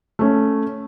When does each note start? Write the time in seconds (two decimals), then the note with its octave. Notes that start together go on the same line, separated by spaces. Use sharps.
0.19 A3 C#4